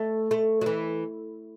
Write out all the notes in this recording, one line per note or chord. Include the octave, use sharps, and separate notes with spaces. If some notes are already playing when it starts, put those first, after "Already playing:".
Already playing: A3
A3
F#3
E3